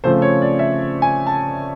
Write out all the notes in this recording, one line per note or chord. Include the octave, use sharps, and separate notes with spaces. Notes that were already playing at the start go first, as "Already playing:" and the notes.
C#3 F3 A3 C4 C5
C#5
D5
E5
G#5
A5